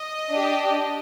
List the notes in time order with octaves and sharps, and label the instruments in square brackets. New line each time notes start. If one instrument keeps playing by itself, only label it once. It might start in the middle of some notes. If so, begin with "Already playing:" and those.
Already playing: [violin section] D#5
D4 G4